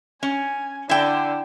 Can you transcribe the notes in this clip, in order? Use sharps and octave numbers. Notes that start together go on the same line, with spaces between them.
C#4 G#5
D3 E4 G5